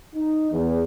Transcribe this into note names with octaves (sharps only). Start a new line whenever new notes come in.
D#4
E2